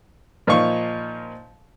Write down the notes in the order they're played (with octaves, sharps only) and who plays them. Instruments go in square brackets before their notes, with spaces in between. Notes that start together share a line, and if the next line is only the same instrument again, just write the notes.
[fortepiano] A#2 F3 D#4 F5 C#6